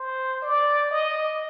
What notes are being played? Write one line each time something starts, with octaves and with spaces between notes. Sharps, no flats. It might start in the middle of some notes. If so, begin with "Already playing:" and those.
Already playing: C5
D5
D#5